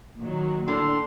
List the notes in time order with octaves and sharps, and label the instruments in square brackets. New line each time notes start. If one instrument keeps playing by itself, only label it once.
[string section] A#2 D#3 F#3
[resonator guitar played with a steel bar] A2 D3 [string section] D4 [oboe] C6